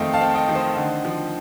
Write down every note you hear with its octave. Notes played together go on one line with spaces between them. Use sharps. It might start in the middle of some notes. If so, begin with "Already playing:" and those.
Already playing: F2 D#3 A3 C4 D#5 F5 G5
F5 A5
C4
D#5 G5
D#3
C5 D#5
D3
F3